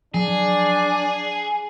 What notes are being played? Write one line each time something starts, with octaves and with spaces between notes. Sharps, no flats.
F3 F#3 D4 G#4